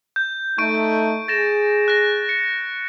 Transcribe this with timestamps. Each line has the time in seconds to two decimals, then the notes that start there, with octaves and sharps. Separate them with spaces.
0.16 G6
0.58 A3 D#4 C#6 G6 D7
1.28 G#4 A6 A#6 E7
1.88 F#6 A#6
2.29 C#7